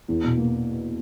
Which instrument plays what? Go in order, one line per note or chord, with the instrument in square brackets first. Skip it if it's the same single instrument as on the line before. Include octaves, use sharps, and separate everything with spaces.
[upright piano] E2
B2
A#3